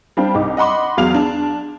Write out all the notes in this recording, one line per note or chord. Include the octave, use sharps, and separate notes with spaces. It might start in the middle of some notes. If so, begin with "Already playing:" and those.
G3 C4 D4 F5 G5
C2 D#4 D6
D#5 F#5 B5 C6 D6
E2 F#3 F5 F7
D4